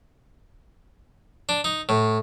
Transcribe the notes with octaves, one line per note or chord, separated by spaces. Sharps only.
D4
D#4
A2